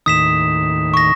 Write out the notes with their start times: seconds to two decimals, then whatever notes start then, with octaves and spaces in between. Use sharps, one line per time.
0.06 D#2 A2 D#3 D#6 B6 E7
0.94 C#6 A#6